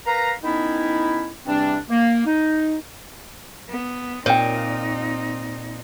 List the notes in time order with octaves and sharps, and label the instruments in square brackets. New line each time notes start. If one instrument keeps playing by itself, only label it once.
[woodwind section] A#4 B4 F5 A#5
D#3 B3 C#4 D#4 E4
E2 C3 G3 C4 D4
A#3
D#4
[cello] B3
[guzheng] A#2 [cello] C4 D#4 [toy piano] C#5 G5